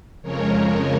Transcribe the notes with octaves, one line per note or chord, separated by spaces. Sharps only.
F2 C#3 F3 G#3 A#4 C#5